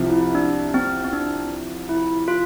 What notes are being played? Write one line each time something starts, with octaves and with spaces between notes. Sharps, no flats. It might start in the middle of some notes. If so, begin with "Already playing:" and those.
Already playing: C2 C3 F3
E4
D4
C4
C4
D4
E4
F4